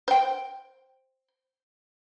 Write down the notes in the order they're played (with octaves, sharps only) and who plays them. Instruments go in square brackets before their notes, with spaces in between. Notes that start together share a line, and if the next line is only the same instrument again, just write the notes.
[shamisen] C5 G5